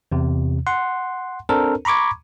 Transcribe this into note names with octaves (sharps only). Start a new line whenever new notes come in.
E2 C3
F#5 C6
C4 D4 A4 A#4 C5
A#5 B5 C#6 D6 G#6